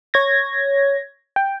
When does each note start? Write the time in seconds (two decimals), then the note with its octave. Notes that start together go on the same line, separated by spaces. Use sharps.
0.14 C#5 G#6 A#6
1.36 G5